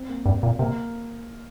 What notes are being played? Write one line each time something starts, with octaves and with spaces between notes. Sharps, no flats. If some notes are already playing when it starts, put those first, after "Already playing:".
Already playing: C4
A#3
G2
A#2
C3 A#3